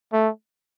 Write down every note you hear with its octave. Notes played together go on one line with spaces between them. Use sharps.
A3